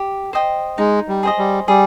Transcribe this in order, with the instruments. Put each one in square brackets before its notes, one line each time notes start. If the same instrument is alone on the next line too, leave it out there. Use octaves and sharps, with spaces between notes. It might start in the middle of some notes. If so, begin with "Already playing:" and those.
Already playing: [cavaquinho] G4
C5 D#5 G5
[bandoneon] G#3 [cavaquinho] D#4
[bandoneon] G3
[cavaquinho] G#4 C5 D#5
[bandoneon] G3
[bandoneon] G3 [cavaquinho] G#4